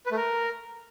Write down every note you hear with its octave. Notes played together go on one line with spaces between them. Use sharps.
B4
A3
A#4